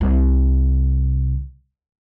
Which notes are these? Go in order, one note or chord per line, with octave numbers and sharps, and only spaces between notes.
C2 C3